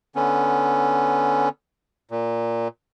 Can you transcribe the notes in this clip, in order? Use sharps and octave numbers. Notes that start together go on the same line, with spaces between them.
D3 B3 C#4
A#2